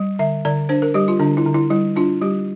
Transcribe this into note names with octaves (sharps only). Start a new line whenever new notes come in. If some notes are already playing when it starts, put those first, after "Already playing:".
Already playing: G3
D3 E5
D3 D5
D4 C5
A#4
G3 G4
F4
D3 D4
E4
D3
E4
G3 E4
D4 F4
G3 G4